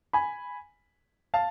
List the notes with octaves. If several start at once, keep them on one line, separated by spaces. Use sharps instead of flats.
G#5 B5
F5 A5